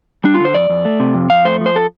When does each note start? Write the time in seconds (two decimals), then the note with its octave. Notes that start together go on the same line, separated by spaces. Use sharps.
0.24 G3 D4
0.34 F4
0.40 D3 C5
0.54 F2 D5
0.70 F2
0.85 A3
1.00 C3
1.14 F2
1.30 F2 F5
1.45 A3 C5
1.61 F3
1.66 C5
1.76 A4